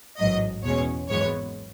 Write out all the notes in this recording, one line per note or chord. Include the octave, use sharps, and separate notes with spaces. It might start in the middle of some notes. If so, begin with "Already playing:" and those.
A1 G#2 F#3 D#5
E2 B2 G#3 C#4 C#5
G#1 F#2 E3 G#3 B3 C#5